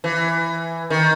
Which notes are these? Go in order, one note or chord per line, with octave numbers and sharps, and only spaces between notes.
E3
D#3